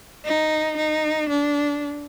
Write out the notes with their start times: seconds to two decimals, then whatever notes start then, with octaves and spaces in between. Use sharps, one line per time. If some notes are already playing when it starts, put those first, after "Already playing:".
0.25 D#4
0.77 D#4
1.29 D4